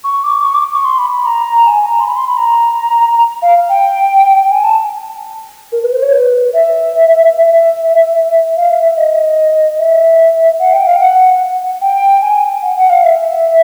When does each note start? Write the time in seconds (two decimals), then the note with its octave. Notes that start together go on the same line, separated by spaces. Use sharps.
0.04 C#6
0.24 D6
0.44 C#6
0.55 D6
0.75 C#6
0.85 C6
0.98 B5
1.12 B5
1.25 A#5
1.66 G#5
1.86 A#5
2.00 C6
2.07 B5
2.17 C6
2.27 B5
2.37 A#5
3.42 F5
3.69 G5
4.50 G#5
4.64 A5
5.72 A#4
5.82 B4
5.92 C5
6.02 C#5
6.13 B4
6.53 E5
7.35 E5
8.57 F5
8.70 E5
8.83 E5
8.97 D#5
9.79 E5
10.59 F#5
10.73 G5
10.86 F5
11.00 F#5
11.81 G5
12.22 G#5
12.62 F#5
12.76 F#5
12.90 F5
13.04 E5